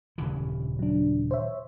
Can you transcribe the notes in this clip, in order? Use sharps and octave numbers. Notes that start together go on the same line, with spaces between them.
D#1 C#3 E3
F#3 D4
C5 C#5 E5